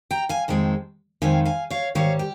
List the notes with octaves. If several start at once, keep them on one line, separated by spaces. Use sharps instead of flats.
G5 A#5
F5 G#5
F2 D#3 G#3 C4
F2 D#3 G#3 C4 F5 G#5
F5 G#5
C#5 F5
G#2 D#3 G3 C#5 F5
G4